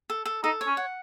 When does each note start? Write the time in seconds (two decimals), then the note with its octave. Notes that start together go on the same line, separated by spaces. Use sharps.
0.10 A4
0.25 A4
0.43 D#4 A4
0.61 C#5
0.67 C#4
0.77 F#5